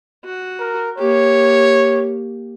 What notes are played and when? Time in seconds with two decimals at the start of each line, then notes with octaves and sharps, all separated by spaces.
0.24 F#4
0.60 A#4
0.98 A#3 G4 C#5